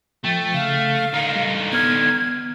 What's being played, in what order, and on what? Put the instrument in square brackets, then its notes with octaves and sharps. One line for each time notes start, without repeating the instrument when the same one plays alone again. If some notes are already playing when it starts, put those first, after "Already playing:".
[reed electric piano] F3 G5 A6 [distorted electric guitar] A3
[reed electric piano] C#3 [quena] F5
[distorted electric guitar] D3 D#4
[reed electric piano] G3
[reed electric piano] B3 F6 [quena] G#6